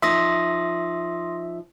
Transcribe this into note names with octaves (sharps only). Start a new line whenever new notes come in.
F3 D#4 E5 C6 D#6 A#6